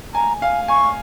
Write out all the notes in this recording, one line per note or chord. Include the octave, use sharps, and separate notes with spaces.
G#5 A#5
F5 G#5
G#5 C#6